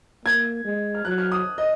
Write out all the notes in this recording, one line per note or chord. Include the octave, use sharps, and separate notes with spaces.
A#3 G#6
G#3
F6
F#3 F#6
F6
D#6
D#5